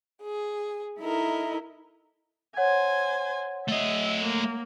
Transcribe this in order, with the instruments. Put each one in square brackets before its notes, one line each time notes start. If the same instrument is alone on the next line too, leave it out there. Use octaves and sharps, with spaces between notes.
[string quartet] G#4
D#4 E4 A4 A#4 D#5
[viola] C5 G#5 [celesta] C#5 F#5 G#6
[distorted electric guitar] A3 D#5 [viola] E5
[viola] A#3